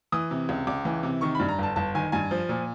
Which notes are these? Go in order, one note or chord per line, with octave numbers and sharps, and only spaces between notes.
E3 D#6
C3
C#2
C#2 D6
E3
C3
D#3 C#6
B5
G2
A#5
G1 A5
G1 A5
D#3 G#5
G2 G#5
F3
A#2